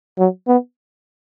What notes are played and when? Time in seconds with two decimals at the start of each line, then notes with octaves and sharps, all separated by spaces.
0.19 F#3
0.48 B3